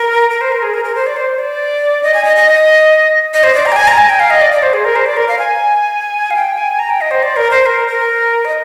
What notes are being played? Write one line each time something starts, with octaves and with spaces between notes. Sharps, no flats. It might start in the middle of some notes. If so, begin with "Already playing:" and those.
Already playing: A#4
A#4
C5
A#4
G#4
A#4
A#4
C5
D5
C5
D5
D#5
G#5
D#5
D#5
D#5
C5
D5
A#5
G5
G#5
A#5
G#5
G5
F5
D#5
D5
D5
C5
G#4
A#4
C5
D5
A#4
F5
G#5
F5
G5
G#5
A#5
G5
D#5
C5
D5
A#4
C5
A#4
A#4
D#5